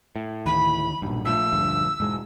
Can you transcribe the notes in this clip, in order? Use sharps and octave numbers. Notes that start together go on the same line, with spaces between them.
A2
D2 D#3 E3 B5
B1 G2 A#2
A#1 F3 A3 E6
D2 G2
E1 G#2 G#3